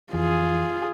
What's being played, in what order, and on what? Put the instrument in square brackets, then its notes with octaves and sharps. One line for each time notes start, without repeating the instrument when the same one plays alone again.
[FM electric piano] F2 E3 [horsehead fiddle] F4 G#4